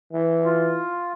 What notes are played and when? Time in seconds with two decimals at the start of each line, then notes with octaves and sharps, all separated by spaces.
0.13 E3
0.45 F4